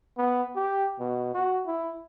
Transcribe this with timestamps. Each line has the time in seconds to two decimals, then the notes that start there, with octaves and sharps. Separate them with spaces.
0.18 B3
0.56 G4
1.00 B2
1.34 F#4
1.66 E4